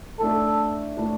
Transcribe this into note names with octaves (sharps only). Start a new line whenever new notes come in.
A2 A3 D4 A4
A2 A3 D4